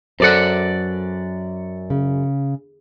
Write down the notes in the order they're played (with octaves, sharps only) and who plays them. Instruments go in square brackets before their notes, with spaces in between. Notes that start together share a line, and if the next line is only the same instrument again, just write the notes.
[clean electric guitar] F#2 D5 F#5 [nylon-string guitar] A4 C5
[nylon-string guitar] C#3